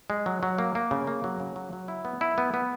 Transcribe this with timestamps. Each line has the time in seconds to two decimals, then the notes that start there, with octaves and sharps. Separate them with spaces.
0.10 G#3
0.26 F#3
0.43 F#3
0.58 A#3
0.75 A#3
0.91 C#3
1.07 A#3
1.24 F#3
1.40 C#3
1.56 F#3
1.73 F#3
1.88 E4
2.05 B3
2.21 E4
2.38 B3
2.54 B3